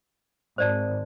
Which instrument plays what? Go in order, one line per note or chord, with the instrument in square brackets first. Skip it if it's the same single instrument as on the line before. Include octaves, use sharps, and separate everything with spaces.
[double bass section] G#1 [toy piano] C5 D5 A5